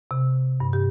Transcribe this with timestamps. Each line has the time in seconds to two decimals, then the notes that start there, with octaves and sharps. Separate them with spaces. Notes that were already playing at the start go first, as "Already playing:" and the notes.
0.11 C3
0.60 G2
0.73 G4